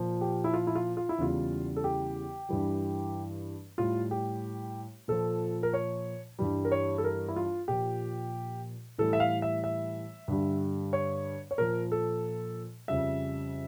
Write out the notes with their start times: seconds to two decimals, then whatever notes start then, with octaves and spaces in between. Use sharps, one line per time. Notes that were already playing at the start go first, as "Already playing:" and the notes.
Already playing: A#2 F3
0.21 G4
0.44 E4
0.53 F4
0.67 E4
0.75 F4
0.97 F4
1.09 E4
1.18 E2 C#3 E3 G3 F4
1.76 A4
1.84 G4
2.49 G2 E3 G3
3.78 A2 G3 F4
4.11 G4
5.08 A#2 F3 A4
5.63 A#4
5.74 C#5
6.39 G2 E3 G3
6.65 A#4
6.72 C#5
6.98 A4
7.04 A#4
7.28 E4
7.36 F4
7.68 A#2 F3 G4
8.98 A2 E3 G3 A4
9.13 E5
9.20 F5
9.42 E5
9.64 E5
10.28 G2 D3 G3
10.93 C#5
11.51 C#5
11.58 A#2 F3 A#4
11.92 A4
12.88 F2 C#3 G3 E5